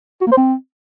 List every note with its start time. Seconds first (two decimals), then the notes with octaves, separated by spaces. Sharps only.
0.21 F#4
0.27 A#3
0.32 C5
0.37 C4